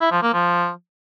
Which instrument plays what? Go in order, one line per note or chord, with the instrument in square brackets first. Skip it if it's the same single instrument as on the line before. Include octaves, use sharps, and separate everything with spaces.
[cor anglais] E4
F3
A#3
F3